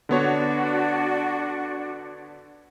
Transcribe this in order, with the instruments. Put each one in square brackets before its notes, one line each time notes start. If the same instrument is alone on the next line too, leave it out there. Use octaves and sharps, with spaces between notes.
[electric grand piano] D3 B3 C#5 [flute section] D4 F#4